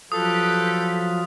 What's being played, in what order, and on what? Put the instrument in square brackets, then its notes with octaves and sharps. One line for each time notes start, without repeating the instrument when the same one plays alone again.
[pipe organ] F3 F#3 F4 [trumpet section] G4 B4 [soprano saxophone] A4 [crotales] D#6